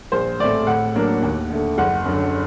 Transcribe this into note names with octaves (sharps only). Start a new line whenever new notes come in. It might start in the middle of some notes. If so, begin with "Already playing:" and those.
A#1 C5
A2 A3 C4 D5
A2 F#5
F#3 A#3 D4
D#2
D3 A3
F#1 F#5
F#2 D3